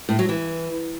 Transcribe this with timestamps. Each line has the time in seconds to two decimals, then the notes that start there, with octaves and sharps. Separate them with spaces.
0.09 A2
0.19 F#3
0.29 E3